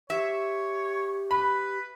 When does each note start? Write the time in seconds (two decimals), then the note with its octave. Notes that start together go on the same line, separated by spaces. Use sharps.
0.10 G4 C#5 E5
1.31 B4 B5